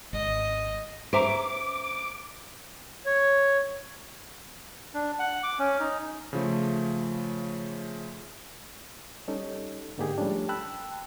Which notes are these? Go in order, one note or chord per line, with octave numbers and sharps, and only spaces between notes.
G#1 D#5
C#4 C5 E5 A#5 D6
C#5
D4
F#5
D6
C#4
D#4
C#3 F3 A3
G3 C#4 D#4 A4
G#2 D3 A#3 D#4 G4 G#4
F3 G3 A3 C#4 D4
G5 A5 B5 E6 F#6